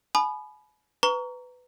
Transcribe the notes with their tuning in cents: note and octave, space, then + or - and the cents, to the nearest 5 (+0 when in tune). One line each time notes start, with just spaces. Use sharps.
G#5 +40 B5 +0 D#6 -40
B4 +15 A#5 -5 C#6 +30